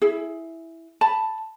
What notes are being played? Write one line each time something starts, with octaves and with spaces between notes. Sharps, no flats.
E4 G#4
A5 B5